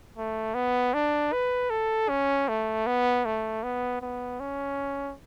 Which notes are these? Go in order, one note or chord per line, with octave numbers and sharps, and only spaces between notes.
A3
B3
D4
B4
A4
C#4
A3
B3
A3
B3
B3
C#4